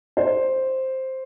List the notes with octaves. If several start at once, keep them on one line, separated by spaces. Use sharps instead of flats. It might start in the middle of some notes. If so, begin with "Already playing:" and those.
C5